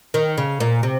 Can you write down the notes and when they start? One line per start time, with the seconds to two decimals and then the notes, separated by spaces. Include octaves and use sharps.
0.14 D#3
0.38 C#3
0.60 A#2
0.83 C3